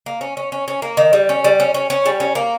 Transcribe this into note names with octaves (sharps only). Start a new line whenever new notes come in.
A#3
C#4
C#4
C#4
C#4
A#3
D#3
G3
C#4
G3
C#4
C#4
C#4
G3
C#4
A#3